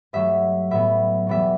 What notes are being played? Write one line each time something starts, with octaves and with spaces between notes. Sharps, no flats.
G2 F#3 A3 E5
A2 F#3 B3 E5
E2 B2 G3 B3 E5